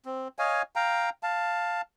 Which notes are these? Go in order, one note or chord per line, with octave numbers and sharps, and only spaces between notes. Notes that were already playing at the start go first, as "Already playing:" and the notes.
C4
C#5 D#5 F5 G#5
F5 G5 A#5
F5 A5